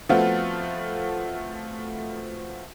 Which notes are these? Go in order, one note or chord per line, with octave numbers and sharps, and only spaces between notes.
F3 A3 B3 C4 F4 F#4